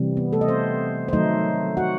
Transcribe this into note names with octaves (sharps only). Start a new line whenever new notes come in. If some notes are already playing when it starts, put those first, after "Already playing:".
Already playing: C3 E3 G3
B3
A3 A4
D#5
C4 C5
C5
D#3 F#3 A3 D#4 D#5
F#4 F#5